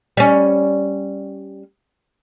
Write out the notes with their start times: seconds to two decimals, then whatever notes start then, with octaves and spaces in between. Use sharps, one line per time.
0.17 G3 C#4